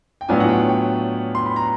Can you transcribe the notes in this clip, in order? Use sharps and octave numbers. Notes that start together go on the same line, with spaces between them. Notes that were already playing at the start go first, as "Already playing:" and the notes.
G5
A2 F#3 B3 D4 F4 G#5
F#5
G5
G5
C6
B5
A#5